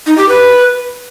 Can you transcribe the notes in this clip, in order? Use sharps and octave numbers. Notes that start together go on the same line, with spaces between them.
D#4
G4
B4